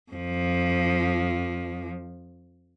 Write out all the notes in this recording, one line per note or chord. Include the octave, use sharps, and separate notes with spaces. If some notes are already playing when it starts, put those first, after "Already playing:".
F2 F3